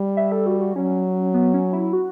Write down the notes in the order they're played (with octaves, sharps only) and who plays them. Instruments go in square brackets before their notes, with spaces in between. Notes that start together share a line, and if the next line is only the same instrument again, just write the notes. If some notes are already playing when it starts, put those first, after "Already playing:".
Already playing: [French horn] G3
[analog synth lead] E5
A4
F#4
F#4
[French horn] F#3 [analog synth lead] C#4
[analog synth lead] B3
C#4
E4
F#4